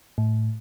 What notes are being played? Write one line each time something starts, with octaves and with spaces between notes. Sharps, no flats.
A2